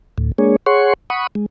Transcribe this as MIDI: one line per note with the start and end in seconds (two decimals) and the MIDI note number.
0.18 0.32 38
0.18 0.32 45
0.38 0.56 56
0.38 0.56 58
0.38 0.56 62
0.38 0.56 68
0.38 0.56 73
0.66 0.94 68
0.66 0.94 73
0.66 0.94 78
0.66 0.94 84
0.66 0.94 85
1.10 1.27 78
1.10 1.27 83
1.10 1.27 85
1.10 1.27 87
1.35 1.46 56